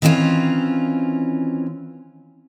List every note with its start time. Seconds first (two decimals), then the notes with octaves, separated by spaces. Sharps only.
0.02 D#3 E3 C4 C#4 F4